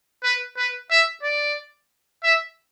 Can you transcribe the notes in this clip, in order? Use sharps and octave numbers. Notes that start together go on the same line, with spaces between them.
B4
B4
E5
D5
E5